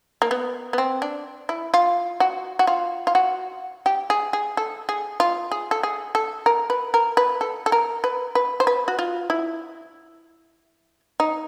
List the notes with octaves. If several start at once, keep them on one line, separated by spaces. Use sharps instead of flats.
A#3
B3
B3
C4
D4
E4
F4
F#4
F#4
F4
F4
F#4
G4
G#4
G#4
A4
G#4
F4
G#4
A4
G#4
A4
A#4
B4
A#4
B4
A4
A4
A#4
B4
B4
C5
B4
F#4
F4
E4
D#4